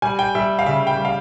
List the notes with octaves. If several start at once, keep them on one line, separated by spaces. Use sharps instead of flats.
G3 G#5
G5
G3 E5
F5
C#3 E5
G5
G3
F5